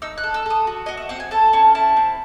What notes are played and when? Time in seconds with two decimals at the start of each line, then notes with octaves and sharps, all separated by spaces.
0.02 D#4 E6
0.18 F#6
0.24 A4
0.34 E6
0.46 A4 D#6
0.67 F#4
0.86 F#4 D#5
0.97 E5
1.09 C4 F#5
1.20 G#5
1.31 A4 A5
1.53 C#4 A5
1.75 E4 A5
1.97 C4